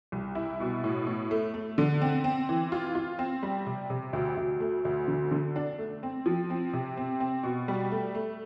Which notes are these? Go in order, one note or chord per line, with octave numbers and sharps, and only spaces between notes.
C2
E4
B2
A2
A2
A3
A3
D3
C4
C4
E3
F4
F4
C4
G3
C3
C3
D2
D2
A3
D2
D3
D3
D4
A3
C4
F3
C4
C3
C4
C4
B2
G3
A3
A3